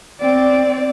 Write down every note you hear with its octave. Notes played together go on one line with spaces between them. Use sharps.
C4 D5